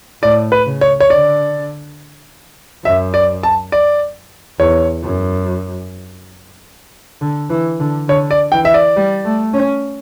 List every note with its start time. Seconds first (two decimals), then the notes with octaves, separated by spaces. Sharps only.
0.22 A2 D5
0.52 B4
0.66 C#3
0.81 C#5
1.00 C#5
1.10 D3 D5
2.84 F#2 E5
3.14 D5
3.43 A5
3.72 D5
4.60 E2 C#5
5.03 F#2
7.21 D3
7.50 E3
7.80 D3
8.08 D3 C#5
8.31 D5
8.52 E3 G5
8.65 E5
8.74 D5
8.97 G3
9.24 A3
9.54 C#4